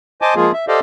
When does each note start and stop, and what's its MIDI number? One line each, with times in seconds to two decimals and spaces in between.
0.22 0.34 72
0.22 0.34 75
0.22 0.34 80
0.22 0.34 81
0.22 0.34 86
0.36 0.52 53
0.36 0.52 56
0.36 0.52 58
0.36 0.52 65
0.36 0.52 68
0.53 0.65 76
0.68 0.80 67
0.68 0.80 69
0.68 0.80 72
0.68 0.80 74
0.68 0.80 75
0.68 0.80 77